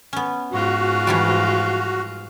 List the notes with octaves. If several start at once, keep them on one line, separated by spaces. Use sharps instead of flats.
B3 C#4
G#2 F4 F#4
E3 F3 G3